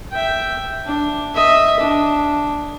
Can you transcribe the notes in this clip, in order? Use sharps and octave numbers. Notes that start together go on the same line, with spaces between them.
E5 G5
D4
D#5 E5
D4